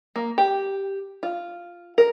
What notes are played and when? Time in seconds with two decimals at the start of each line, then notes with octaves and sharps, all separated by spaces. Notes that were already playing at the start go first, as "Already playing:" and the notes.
0.16 A#3
0.38 G4
1.23 F4
1.98 A#4